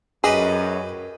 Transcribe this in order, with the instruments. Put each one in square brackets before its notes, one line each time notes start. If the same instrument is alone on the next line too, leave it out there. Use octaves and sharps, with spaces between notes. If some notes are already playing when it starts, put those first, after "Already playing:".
[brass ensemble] F#2 [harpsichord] G4 B4 D#5 [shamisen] G#4